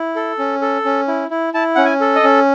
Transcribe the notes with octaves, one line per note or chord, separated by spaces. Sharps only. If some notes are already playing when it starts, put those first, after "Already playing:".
Already playing: E4
A4
C#4
A4
C#4
E4
E4
E4 A5
C#4 F#5
G#5
A4
D#5
C#4